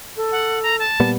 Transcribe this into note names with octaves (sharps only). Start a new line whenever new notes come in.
A4
F#5
A#5
A5
A#2 G3 B3